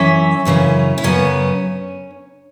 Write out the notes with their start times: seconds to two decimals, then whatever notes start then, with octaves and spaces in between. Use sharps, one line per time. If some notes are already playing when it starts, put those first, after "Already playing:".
Already playing: F#2 E3 C#4 E5
0.45 F#2 C#3 E3 C#4
0.98 E4
1.04 F#2 C#3 F#3 B3 C#4